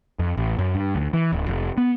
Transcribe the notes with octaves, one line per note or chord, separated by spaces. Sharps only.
F2
A1
F#2
G2
D2
E3
D1
F1
B3